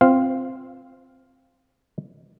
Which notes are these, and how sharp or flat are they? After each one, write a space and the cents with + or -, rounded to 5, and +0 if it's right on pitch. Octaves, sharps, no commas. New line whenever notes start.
C4 +0 F4 +0 F5 +0